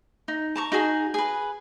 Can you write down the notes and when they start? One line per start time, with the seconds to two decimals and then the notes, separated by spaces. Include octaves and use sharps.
0.28 D#4
0.56 A5 A#5 C#6
0.72 D#4 F#4 G#4
1.14 G#4 B4